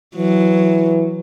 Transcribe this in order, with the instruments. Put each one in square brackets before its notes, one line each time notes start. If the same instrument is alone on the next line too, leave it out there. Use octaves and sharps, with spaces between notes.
[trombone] E3 [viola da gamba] F#3